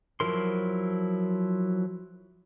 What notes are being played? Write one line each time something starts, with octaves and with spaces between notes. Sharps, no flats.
F3 F#3 E4 A#4 C6